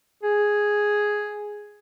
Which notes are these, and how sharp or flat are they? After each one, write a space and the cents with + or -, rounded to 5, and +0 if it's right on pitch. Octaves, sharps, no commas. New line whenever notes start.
G#4 +0